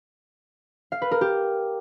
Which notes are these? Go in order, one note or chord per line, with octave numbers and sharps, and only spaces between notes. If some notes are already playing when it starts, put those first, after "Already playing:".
F5
B4
A#4
G4